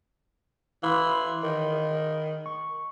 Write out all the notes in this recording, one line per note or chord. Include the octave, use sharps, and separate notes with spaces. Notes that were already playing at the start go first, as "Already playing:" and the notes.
E3 F5 B5 C6
D#3
C#6